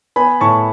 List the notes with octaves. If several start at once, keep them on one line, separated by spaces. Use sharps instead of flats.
B3 G#5 B5
A2 A5 C#6